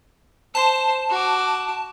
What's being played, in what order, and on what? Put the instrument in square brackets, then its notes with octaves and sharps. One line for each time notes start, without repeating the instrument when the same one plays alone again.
[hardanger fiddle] C5 [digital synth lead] A5
[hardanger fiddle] F#4 D6